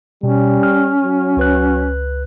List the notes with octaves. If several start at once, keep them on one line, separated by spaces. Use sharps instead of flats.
B2 G3 C#4
F6
F#3
C#2 B4 F#6